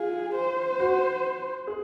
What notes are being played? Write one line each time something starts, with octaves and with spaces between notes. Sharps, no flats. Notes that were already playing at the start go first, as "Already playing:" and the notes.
Already playing: F4 G#4
C5
F#4
G#4